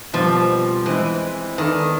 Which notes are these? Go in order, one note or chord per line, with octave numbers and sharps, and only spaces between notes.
B2 F3 G3 C4
E3 G#3 C4 E4
D#3 B3 E4 A4 D5